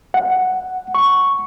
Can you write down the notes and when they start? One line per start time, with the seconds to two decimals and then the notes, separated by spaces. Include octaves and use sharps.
0.14 F#5
0.95 C#6